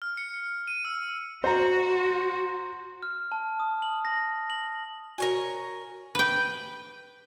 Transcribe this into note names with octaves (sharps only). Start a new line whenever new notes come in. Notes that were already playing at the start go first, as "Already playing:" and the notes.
F6
C#7
D#7
E6
F#4 C5 A#5
F6
A5
D#6
F#7
A#6
F#7
F#4 A#4 C#5 G#5
B4 G5